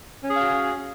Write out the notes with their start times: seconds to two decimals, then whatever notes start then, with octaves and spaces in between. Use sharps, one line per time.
0.23 C#4
0.27 G#4
0.31 C#5
0.34 F5
0.38 F#4